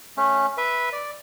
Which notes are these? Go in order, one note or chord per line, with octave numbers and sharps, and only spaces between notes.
A3 C#4
B4 E5
D5